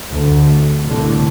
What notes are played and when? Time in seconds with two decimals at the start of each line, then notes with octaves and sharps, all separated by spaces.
0.12 D2
0.84 C2 A2 D3